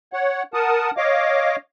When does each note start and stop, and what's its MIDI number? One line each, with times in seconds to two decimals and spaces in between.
0.13 0.43 73
0.13 0.43 78
0.54 0.91 70
0.54 0.91 78
0.54 0.91 81
0.54 0.91 87
0.97 1.56 73
0.97 1.56 75
0.97 1.56 77
0.97 1.56 86